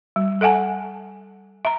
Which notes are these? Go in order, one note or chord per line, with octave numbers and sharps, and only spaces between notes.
G3
A4 E5 F#5 G#5 A5
E5 A#5